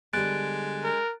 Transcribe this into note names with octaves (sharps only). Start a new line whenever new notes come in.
D3 G3 G#3 B3 F#6 A6 D7
A#4